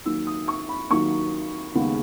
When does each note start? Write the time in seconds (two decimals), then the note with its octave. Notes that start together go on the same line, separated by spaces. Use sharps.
0.06 D#2 D#3 F#3 A#3 E6
0.27 D#6
0.48 C#6
0.69 B5
0.90 D#2 D#3 F#3 A#3 C#6
1.75 D#2 C#3 G#3 B3